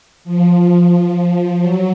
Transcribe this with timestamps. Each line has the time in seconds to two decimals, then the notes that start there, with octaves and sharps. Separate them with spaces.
0.24 F3
1.61 F#3